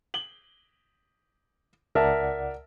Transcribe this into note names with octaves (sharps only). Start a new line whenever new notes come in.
F#7 G7
C#2 A#4 D5 E5 F#5 A5